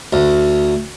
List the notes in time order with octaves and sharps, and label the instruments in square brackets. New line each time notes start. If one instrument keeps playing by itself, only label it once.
[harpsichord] D2